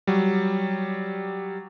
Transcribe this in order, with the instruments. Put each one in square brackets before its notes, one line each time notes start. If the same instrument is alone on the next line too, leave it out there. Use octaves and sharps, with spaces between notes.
[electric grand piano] F#3 G3